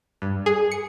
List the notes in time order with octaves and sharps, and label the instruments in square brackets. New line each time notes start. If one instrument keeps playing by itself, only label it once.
[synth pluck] G2
G#4
C#7